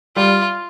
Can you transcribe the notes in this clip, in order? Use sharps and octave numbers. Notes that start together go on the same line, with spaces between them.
G3 F4